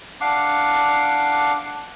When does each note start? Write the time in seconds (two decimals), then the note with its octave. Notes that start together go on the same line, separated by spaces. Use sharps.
0.21 D4 F5 F#5 D6